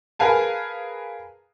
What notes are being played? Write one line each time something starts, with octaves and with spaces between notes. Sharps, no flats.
G#4 A#4 B4 F5 G#5 A5